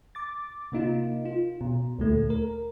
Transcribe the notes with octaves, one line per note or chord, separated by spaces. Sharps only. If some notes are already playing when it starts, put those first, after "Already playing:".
D6 A6
C3 A#3 D#4 F4
F4
B2
D2 A#2 A3
A#4